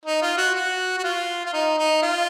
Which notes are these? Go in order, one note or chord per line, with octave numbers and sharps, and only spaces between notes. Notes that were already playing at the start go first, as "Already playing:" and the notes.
D#4
F4
F#4
F#4
F#4
F4
F4
D#4
D#4
F4